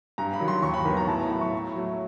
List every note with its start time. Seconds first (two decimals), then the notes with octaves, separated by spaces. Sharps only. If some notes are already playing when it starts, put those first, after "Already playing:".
0.18 G2 A#5
0.33 B5
0.40 D#3 F#3
0.48 C6
0.62 D#2 C#6
0.74 B5
0.85 D#3 F#3 B3 B5
0.97 A#5
1.07 A2 A5
1.19 A#5
1.30 F#3 A3 B5
1.41 C#6
1.52 A2
1.75 F#3 A3